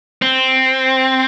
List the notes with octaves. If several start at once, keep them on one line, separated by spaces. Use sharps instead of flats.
C4